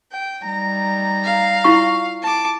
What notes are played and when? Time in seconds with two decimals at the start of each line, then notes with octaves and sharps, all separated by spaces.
0.12 G5
0.46 G3 D#4 A#5
1.24 F5
1.64 E4 F4 C#6
2.23 A5 D6